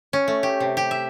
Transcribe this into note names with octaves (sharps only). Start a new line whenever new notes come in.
C#4
A3
G4
C3
G4
E5